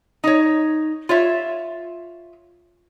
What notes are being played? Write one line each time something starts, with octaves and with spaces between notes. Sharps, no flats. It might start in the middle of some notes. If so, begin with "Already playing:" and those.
D#4 C#5
F4 C#5 E5